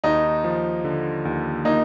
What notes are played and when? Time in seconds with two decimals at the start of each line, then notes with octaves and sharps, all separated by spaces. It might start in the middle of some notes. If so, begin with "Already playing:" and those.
0.04 D#2 D#4
0.44 F3
0.84 D3
1.25 D#2
1.65 A#3 D#4